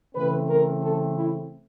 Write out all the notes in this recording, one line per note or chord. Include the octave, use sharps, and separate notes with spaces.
C#3 E3 A3 C4 B4
A#4
A4
E4